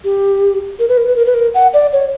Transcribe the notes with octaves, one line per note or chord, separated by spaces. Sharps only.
G4
A#4
B4
A#4
B4
A#4
B4
A#4
F#5
D5
C#5